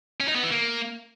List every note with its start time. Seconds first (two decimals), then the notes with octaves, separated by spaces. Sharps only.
0.20 C#4
0.28 D#4
0.36 B3
0.43 E3
0.51 A#3